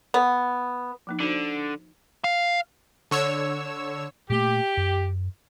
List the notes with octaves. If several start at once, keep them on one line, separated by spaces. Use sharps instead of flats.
B3
F3 A#3 D#4
D3 D#4 F#4 C5
F5
D3 C#5 E6
A#2 A3 A#3 G4
F#2